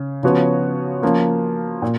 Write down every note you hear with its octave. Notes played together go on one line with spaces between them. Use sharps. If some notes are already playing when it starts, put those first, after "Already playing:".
Already playing: C#3
C#3 F3 B3 F#4 C#5
F3 A#3 C#4
A#2